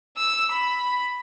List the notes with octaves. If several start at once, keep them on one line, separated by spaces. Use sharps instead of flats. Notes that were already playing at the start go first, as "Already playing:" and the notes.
E6
B5